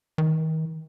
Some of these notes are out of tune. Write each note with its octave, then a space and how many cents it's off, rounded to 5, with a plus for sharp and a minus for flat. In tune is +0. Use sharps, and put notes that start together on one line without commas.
D#3 +35